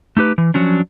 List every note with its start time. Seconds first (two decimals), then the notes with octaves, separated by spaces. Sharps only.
0.17 A3 D#4 G4 B4
0.38 E3
0.54 F3 F#3 C#4 D4